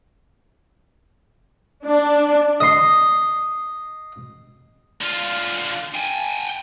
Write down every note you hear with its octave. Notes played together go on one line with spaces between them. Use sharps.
D4
D#5 C6
D3 F4
G5 G#5